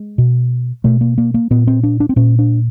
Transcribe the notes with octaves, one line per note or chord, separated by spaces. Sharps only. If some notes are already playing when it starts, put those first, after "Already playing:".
Already playing: G#3
B2
B2 A3
A#3
A#3
A#3
A#2 B3
C4
D4
D4
C4
A#2 C#4
D4